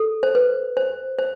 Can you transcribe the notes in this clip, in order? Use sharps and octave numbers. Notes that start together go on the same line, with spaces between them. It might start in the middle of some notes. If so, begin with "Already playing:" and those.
Already playing: A4
C5
B4
C5
C5